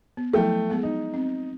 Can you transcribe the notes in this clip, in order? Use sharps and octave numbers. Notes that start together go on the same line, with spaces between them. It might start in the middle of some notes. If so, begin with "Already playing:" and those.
B3
F3 F#3 A3 E4 G5
G#3 B3 G#4
D#4
C4